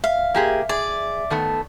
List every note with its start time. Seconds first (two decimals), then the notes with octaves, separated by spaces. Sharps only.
0.04 E5 F5
0.34 A#3 G4 G#4
0.69 G#4 D5
1.30 D#3 A3 B3